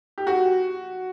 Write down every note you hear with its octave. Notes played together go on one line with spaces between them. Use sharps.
G4
F#4